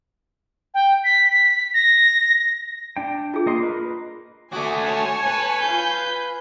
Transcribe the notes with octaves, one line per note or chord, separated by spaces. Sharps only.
G5
B6
B6
A#6
D4 G5
F4 G#4
A#3 D#5 C6
A#4 B4 D#5
A3 F#4 G#5 D6 D#6
C#5 A5
B4
F4 G6